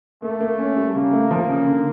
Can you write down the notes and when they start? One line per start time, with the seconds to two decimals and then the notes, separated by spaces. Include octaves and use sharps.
0.22 A3 A#3
0.40 A#3
0.59 C#4
0.77 G3
0.94 C#3 A#3
1.13 A3
1.31 F3
1.49 C#3
1.67 D3